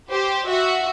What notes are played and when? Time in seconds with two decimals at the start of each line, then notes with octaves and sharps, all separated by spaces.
0.11 G4 C5
0.48 F#4 E5